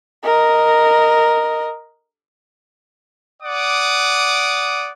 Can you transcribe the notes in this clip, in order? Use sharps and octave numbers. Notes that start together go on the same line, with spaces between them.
A#4 D#5
D5 F#5 D6 D#6